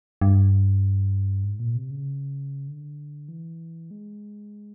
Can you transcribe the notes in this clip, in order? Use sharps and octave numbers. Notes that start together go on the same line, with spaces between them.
G2
G#2
A#2
C3
C#3
D3
E3
G#3